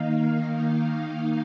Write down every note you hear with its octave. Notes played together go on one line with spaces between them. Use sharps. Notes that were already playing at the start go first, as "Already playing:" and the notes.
Already playing: D#3 A#3 D#4 F5